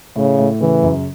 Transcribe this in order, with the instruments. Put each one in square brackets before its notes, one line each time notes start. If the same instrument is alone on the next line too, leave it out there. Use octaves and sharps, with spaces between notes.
[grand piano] A2 [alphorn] C#3
[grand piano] A2
[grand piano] C#3 [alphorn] E3
[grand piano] F#2